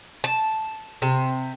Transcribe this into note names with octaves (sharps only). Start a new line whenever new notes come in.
A5
C3